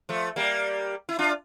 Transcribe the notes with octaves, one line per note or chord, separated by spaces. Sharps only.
F3 A3
G3 A#3
E4
D4 F4